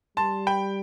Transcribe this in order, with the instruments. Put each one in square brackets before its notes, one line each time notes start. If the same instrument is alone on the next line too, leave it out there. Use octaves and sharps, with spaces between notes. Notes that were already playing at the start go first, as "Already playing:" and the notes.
[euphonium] G3 [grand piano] A5 C6
[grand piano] G5 B5